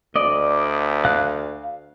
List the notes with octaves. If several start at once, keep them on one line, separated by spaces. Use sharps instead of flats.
D2 D5 D#5
F5 F#6